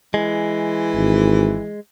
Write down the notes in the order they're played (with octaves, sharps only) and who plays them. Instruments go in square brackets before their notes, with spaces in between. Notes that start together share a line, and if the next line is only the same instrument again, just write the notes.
[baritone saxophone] E3 [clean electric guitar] G#3
[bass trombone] G#1